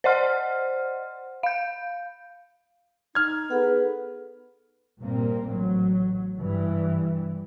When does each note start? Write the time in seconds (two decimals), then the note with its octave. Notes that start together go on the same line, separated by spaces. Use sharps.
0.04 C5 D5 D#5 F#5 C6 F6
1.43 F5 G6
3.15 D#4 F6 G#6
3.50 B3 G#4 A4 F#5
5.01 G2 A#2 A#3 C4
5.50 A1 F#3
6.39 G2 E3